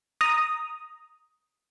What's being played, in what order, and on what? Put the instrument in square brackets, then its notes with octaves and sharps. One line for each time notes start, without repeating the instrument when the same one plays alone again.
[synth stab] A#5 D#6